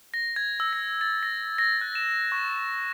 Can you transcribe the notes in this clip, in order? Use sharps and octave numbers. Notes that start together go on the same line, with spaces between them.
A#6
G#6
E6
A#6
A6
A#6
A#6
F#6
E7
C#6